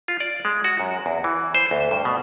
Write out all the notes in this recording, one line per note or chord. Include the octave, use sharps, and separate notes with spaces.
F4
D5
G#3
F#4
F#2
E2
E3
C5
D2
G2
B2